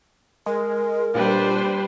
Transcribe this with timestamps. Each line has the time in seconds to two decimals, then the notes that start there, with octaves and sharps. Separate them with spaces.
0.46 G#3 A#4
1.15 A#2 G3 D4 B4 C5